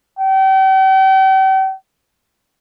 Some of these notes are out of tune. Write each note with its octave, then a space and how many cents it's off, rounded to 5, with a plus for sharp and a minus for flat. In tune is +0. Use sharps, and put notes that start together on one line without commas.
G5 -40